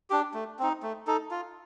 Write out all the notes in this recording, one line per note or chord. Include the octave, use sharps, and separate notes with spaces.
D4 G4
A3
C4 D#4
A3
D#4 A4
F4